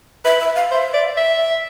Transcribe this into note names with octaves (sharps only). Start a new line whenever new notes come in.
B4 E5
E5
F5
C5 E5
D5
E5